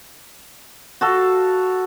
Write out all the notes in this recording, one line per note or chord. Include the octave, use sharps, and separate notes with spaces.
F#4 A4 F5